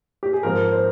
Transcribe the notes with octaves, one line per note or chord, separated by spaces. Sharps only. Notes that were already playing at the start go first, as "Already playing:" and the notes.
G4
G#4
G#2 F3 C4 A#4
C5